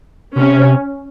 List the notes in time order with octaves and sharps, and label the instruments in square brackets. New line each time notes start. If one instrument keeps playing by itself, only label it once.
[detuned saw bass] C3 [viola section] C#4